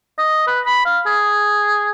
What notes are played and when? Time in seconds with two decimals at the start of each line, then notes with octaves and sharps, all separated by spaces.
0.19 D#5
0.47 B4
0.67 B5
0.86 F5
1.07 G#4